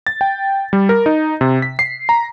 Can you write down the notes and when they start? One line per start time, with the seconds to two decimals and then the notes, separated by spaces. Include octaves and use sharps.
0.07 A6
0.21 G5
0.73 G3
0.89 A#4
1.06 D#4
1.41 C3
1.62 B6
1.79 C7
2.09 A#5